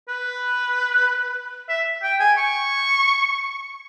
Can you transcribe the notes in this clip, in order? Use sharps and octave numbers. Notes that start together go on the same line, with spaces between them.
B4
E5
G5
G#5
C#6